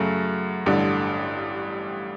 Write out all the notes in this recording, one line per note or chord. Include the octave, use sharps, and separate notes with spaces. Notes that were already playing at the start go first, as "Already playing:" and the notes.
Already playing: F#2 C#3 F#3 A3
A1 G2 D3